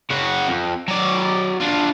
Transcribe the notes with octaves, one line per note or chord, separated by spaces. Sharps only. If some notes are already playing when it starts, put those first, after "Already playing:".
C#3 F#4
F2
F#3 D5
D4 F4